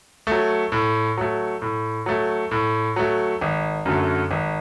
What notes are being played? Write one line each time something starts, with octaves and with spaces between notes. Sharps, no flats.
F#3 A3
A2
F#3 A3
A2
F#3 A3
A2
F#3 A3
G#1
F#2 D3 F#3 A3
G#1